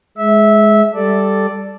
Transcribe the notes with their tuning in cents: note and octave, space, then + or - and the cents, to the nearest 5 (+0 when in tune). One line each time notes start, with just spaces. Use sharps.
G#3 +15 E5 -15
G3 +0 A4 +0 D5 +0